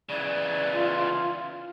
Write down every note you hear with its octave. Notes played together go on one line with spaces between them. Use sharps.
C#3 E3 D5
F4